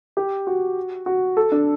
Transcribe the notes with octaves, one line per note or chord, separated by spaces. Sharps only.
G4
F#4
F#4
A4
D4